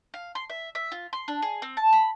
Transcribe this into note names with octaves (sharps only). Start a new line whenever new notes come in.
F5
C6
E5
E5
F4
C6
D4
G#4
C4
A5
B5